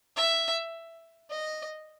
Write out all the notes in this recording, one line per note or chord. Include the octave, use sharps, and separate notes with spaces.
E5
D#5